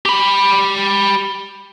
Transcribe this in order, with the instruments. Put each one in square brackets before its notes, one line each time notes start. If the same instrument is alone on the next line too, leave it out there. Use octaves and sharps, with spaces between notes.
[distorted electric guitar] G4 B5